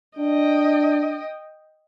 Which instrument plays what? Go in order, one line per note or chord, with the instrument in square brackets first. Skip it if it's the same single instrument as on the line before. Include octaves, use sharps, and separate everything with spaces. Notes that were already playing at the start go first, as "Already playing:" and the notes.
[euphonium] D4 [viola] D#5 G5